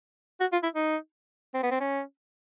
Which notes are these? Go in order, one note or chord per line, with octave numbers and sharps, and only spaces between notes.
F#4
F4
E4
D#4
C4
B3
C4
C#4